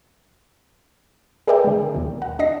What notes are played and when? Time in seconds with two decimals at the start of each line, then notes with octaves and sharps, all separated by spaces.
1.47 G#4 A#4 B4 D5 E5 G5
1.64 D3 G#3
1.95 D#2 B2
2.22 F#5 A#5
2.39 D4 D#5 A#6 C7